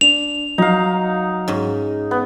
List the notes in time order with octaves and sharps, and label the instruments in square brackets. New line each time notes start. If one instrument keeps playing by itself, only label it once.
[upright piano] D4 [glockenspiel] F7
[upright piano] F#3 [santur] D#4 F5
[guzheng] G#2 C#4
[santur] B3